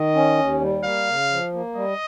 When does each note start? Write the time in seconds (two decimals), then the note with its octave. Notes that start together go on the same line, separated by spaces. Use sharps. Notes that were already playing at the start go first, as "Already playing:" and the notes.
Already playing: D#3 D#5
0.15 C#4
0.39 D#2
0.61 G3
0.84 A#3 F5
1.07 C#3
1.30 F3
1.53 A#3
1.75 G3 D#5